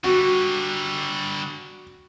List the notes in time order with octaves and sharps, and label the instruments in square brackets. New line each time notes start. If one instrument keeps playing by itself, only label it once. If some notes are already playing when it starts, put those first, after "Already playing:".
[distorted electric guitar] D3 G3 [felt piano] F#4